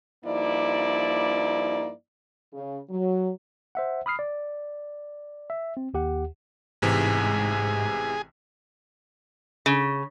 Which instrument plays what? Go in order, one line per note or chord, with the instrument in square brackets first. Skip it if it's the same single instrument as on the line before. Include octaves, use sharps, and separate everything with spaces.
[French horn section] G2 F3 A#3 D#4 E4 D5
C#3
F#3
[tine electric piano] C5 E5 F#5
B5 D#6 F6 C7
D5
E5
C4
D#2 G4 F#5
[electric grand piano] A1 C3 E3 [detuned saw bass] G#2 [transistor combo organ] G#4
[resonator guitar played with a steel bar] C#3